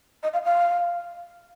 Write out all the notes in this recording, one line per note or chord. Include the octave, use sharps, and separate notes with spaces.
D#5
F5
F5